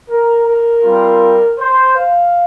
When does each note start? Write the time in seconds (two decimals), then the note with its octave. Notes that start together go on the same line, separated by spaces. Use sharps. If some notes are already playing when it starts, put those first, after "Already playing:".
0.09 A#4
0.47 A#4
0.83 G3 C4 F4
1.59 C5
1.95 F5